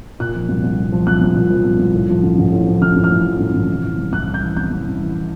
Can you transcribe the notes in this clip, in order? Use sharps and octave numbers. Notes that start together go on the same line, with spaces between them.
A#2 F#6
F3
C2
C2
A#2
F3
C2 F#6
C2
A#2
F3
C2
C2
A2
F3
A1
A1
A2
F3
A1 F6
A1
F6
A2
F3
A1
A1
C3
E3
C2
C2 F#6
C3
G6
E3
C2 G6
C2
C3
E3